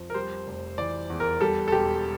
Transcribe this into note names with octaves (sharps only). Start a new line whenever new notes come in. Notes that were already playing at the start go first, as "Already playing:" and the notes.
Already playing: F2
A#4
G3 C5
F1
E3 D5
E2
A#4
G3 A4
A4
E1 G4